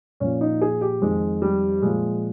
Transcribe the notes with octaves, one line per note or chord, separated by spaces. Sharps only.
A#2 F3 C#4
D#4
G#4
G4
F2 D#3 G#3
G3
A#2 F3 G#3